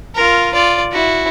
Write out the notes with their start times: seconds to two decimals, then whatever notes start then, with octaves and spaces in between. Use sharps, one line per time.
0.15 F4 A#4
0.54 F4 D5
0.92 E4 F#4